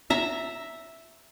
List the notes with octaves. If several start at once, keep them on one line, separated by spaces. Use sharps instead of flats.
E5 A#5